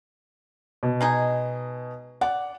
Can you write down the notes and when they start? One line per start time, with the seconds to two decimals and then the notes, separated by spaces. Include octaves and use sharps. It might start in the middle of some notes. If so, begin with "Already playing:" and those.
0.83 B2
1.01 G#3 D#4 G#4
2.21 D5 F#5